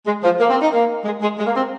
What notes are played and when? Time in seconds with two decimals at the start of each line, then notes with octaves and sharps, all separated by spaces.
0.07 G#3
0.23 F3
0.40 A#3
0.50 C4
0.61 D#4
0.73 A#3
1.05 G#3
1.22 G#3
1.38 G#3
1.46 A#3
1.55 C4